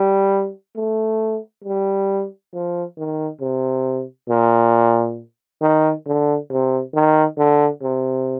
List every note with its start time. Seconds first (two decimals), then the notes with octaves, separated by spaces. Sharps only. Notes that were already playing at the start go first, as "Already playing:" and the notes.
Already playing: G3
0.76 A3
1.64 G3
2.53 F3
2.97 D#3
3.41 C3
4.29 A#2
5.61 D#3
6.06 D3
6.50 C3
6.94 D#3
7.38 D3
7.82 C3